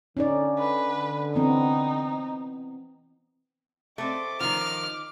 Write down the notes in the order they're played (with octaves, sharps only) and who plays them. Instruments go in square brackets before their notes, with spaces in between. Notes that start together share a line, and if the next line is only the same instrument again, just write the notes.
[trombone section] D3 [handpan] C#4 D#4 D5
[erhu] B4
[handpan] E3 B3 C4 [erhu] D#4
[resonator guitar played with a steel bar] A3 C4 [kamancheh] D#5 D6
[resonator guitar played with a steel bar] D#3 F3 [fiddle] F6